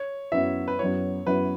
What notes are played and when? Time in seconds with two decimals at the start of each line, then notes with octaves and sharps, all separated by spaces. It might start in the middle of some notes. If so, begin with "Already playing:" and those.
Already playing: C#5
0.32 F#2 F#3 B3 E4 E5
0.68 B4
0.79 F#2 F#3 B3 E4 C#5
1.26 F#2 F#3 B3 E4 B4